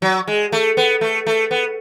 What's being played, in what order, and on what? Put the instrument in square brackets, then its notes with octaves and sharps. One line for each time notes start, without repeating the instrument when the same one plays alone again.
[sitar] F#3
G#3
A3
B3
A3
A3
B3